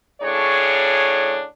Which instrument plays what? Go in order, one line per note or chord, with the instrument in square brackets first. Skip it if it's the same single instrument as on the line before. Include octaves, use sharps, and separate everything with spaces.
[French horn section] A2 C#3 D4 G#4 C#5